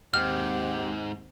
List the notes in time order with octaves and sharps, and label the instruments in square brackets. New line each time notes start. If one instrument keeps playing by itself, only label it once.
[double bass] D#2 C4 [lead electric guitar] G#2 [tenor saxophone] G4 [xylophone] F6